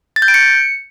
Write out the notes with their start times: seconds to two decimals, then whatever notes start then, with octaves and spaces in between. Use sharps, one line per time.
0.16 A6
0.22 G6
0.28 D7
0.34 C#7